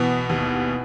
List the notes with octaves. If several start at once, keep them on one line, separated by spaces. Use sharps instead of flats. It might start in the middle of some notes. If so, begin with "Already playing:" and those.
Already playing: B2 E3 B3
D#2